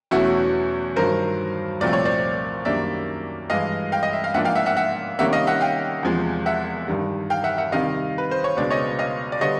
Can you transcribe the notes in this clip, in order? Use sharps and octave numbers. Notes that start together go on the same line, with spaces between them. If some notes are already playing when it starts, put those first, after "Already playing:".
E2 B2 F#3 A3 C#4 E4 F#4
G2 D#3 F#3 A#4 C5
C2 A#2 F3 A3 C4 D5
C#5
C5 D5
F#2 D#3 G3 A#3 D4 D5 E5
G2 E3 G#3 D#5 F5
F5 G5
D#5
E5
F5
G#2 F3 A#3 D4 E5 F#5
F5 G5
E5 F#5
E5 F#5
E5 F#5
C3 D#3 G3 A#3 C#4 E5 F#5
D#5 F5
E5 F#5
F5 G5
E2 C3 F3 G#3
E5 F#5
G2 D#3 G3
F5 G5
E5 F#5
E5 F#5
C3 D#3 G3 D#5 F5
B4
C5
C#5
C#2 B2 G#3 B3 D4 D5
C#5 D#5
D#5 F5
D5
D3 G3 B3 C#5 D#5